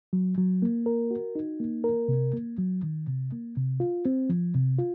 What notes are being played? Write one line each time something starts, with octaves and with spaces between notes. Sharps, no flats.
F#3
F#3
A#3
A#4
F#4
D#4
A#3
A#4
C3
A#3
F#3
D#3
C3
A#3
C3
F4
C4
F3
C3
F4